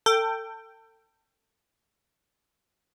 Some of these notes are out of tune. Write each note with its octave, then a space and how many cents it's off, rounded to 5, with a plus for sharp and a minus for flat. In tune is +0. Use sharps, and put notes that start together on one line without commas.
A4 +30 G5 +0